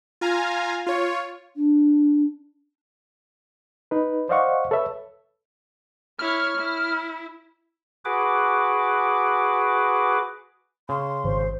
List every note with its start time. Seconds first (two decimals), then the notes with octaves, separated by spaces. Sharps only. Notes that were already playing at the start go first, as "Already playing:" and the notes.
0.21 F4 F5 G#5 A#5
0.87 F4 C#5
1.56 D4
3.91 D#4 B4
4.29 C5 D5 D#5 F5 F#5 C#6
4.71 A4 B4 C#5 E5
6.19 E4 C#5 F6
6.57 E4
8.05 F#4 G#4 B4 D6
10.89 C#3 C6
11.24 G#1 C5